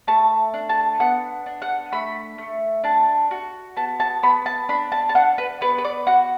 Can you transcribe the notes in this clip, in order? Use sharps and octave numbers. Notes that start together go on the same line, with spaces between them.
A3 A5
D4
A5
B3 F#5
D4
F#5
A3 B5
A3
D4 A5
F#4
B3 A5
A5
B3 B5
A5
D4 B5
A5
A5
D4 F#5
B4
B3 B4
B4
D5
F#4 F#5